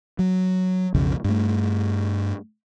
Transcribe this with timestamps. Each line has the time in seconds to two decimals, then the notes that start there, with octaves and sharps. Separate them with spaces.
0.19 F#3
0.95 B1 F2 C#3
1.24 G2 A3